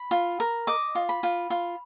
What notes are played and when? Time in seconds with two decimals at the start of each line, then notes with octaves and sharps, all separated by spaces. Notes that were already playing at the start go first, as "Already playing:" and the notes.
Already playing: B5
0.11 F4
0.40 A#4
0.67 D#5 D6
0.95 F4
1.09 B5
1.23 F4
1.50 F4